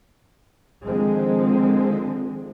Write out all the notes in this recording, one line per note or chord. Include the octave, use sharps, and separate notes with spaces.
D3 D#3 F3 G#3 C4